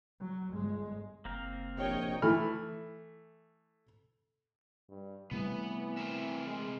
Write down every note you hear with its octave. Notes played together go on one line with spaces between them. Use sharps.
F#3
G1 G#3
F#1 A#3 C4 A#4
A#1 C3 C#5 D#5 G5
E3 A3 B5 F6
G2
C3 E3 G3 A3 B3
C4 A#4 E5
G#3